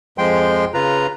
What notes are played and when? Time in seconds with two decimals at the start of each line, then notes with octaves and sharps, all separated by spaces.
0.18 F2 F3 G#3 G5 C6
0.74 C#3 F4 B4 A#5